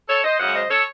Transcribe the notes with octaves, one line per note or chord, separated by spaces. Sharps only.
A4 C#5
C5 D#5
F#2 C#3 G#3 D#5 F#5
C5 D#5
A4 C#5